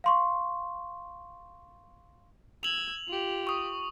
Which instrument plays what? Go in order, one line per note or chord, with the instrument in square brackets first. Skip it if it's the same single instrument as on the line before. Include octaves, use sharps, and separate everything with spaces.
[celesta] F5 C6 C#6
[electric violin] E6 G#6 [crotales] F7 F#7
[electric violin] F4 G4
[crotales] C#6 D#6